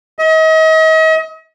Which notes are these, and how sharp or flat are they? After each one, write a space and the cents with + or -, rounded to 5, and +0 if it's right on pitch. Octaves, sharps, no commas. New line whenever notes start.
D#5 +40